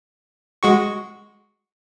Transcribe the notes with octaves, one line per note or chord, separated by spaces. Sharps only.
G#3 F#4 C#6